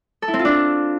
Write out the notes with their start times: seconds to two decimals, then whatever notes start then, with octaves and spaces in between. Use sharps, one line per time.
0.22 A4
0.28 E4
0.34 C4
0.39 F4
0.45 D4